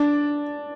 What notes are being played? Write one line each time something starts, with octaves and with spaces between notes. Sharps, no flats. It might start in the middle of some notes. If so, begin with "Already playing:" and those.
Already playing: D4